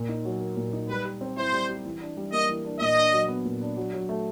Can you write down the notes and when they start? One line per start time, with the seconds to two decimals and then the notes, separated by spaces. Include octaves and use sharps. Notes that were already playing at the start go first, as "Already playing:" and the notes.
Already playing: A#2
0.09 D#4
0.25 F#3
0.41 A#3
0.57 A#2
0.73 D#4
0.89 G3 B4
1.05 G4
1.21 C4
1.37 E4 C5
1.53 G3
1.69 G4
1.85 E3
2.01 D4
2.17 G3
2.32 A#3 D#5
2.49 E3
2.65 D4
2.80 A#2 D#5
2.97 D4
3.13 F#3
3.28 B3
3.45 A#2
3.61 D4
3.77 F#3
3.93 F#3
4.09 A3